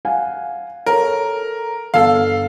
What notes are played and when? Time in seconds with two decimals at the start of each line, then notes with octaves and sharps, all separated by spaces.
0.05 F5 F#5 G#5
0.86 A4 A#4 C#5
1.94 G1 A4 F5